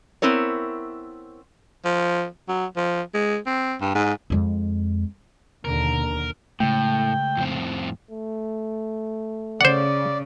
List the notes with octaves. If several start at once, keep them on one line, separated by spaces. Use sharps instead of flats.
B3 C4 E4 A#4 C#5
F3
F#3
F3
G#3
C4
G2
G#2
F2 G#3
D#2 B2 D3 A#4
A2 C#3 G#3 A3 G5
F2 A2 C4
A3
C#3 C5 D5 F#5